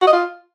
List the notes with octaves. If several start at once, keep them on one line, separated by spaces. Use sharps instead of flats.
F#4
D#5
F4